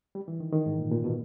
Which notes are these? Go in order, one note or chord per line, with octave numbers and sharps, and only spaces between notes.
G3
E3
D#3
D#3
G#2
A#2
A#2
B2